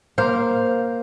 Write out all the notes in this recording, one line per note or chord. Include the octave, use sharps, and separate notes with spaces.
A#3 C5 F5